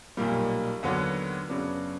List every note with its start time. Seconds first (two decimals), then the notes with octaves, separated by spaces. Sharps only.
0.17 B1 A#2 G3 A#3
0.83 D#2 D3 F#3 B3
1.48 F#2 C#3 F#3 B3 D4